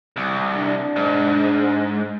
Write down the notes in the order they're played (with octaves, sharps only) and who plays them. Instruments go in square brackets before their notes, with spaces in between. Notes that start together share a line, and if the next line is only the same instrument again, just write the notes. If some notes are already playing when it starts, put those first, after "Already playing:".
[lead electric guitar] C2
[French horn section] D4
[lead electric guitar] G#2